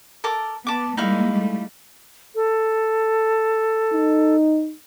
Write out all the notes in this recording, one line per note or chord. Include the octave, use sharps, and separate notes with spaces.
A4 A#4 D6
B3 A5 D6
G3 G#3 A#3 D#4 E4 F5
G3 A3
A4
D#4